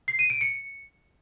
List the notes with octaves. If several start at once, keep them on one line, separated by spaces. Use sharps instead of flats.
C7
D#7
D7
C#7